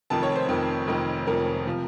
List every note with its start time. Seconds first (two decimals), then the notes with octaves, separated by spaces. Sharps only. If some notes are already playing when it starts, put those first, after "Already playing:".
0.10 F1 F2 D#3 A5
0.23 C#5
0.36 C5
0.48 F1 F2 D#3
0.87 F1 F2 D#3 A#4
1.27 F1 F2 D#3 A#4
1.67 C3 F3